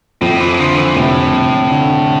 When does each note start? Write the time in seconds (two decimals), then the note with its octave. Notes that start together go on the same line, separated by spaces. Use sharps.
0.21 F2 A2
0.40 E3
0.59 D3 F3
0.77 E3
0.95 F1 A2
1.33 F1
1.71 D3